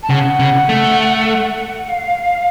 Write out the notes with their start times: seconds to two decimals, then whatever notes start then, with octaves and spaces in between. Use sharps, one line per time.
0.03 A5
0.09 C#3 F#5
0.39 C#3
0.69 A3
1.89 F5